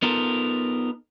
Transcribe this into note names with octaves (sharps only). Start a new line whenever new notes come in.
B3 D#4 F4 A4 A#4